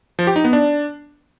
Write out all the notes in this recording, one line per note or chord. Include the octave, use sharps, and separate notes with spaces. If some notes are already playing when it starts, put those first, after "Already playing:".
F3
G4
D#4
B3
D4